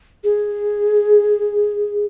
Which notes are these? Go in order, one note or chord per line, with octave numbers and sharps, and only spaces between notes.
G#4